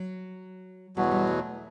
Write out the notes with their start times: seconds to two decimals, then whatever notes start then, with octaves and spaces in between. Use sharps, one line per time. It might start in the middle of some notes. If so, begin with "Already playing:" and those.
Already playing: F#3
0.96 E2 B2 F#3 G3
1.03 A3
1.11 G3
1.27 A3